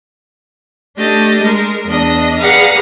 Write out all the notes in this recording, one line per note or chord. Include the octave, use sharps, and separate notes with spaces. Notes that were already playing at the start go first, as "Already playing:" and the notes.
A3 D4 G4 D#5 A6
G#3 A#4
E2 D4 D#5 A#6
G#4 B4 D5 F5 F#5 A#5